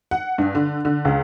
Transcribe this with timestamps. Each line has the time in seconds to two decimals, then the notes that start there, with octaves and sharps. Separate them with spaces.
0.11 F#5
0.38 G2
0.55 D3
0.85 D3
1.05 C#2